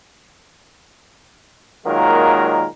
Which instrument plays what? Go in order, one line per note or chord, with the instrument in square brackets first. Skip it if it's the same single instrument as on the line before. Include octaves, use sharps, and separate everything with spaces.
[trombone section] A#2 D#3 F#3 G#3 A#3 A#4